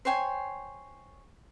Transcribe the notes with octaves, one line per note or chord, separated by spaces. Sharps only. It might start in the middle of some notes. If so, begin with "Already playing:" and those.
C5 C#5 G5 G#5